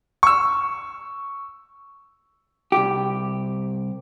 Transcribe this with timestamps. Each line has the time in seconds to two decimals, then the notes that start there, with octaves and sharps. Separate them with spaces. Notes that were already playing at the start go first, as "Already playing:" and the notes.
0.23 C#6 E6
2.72 C2 G4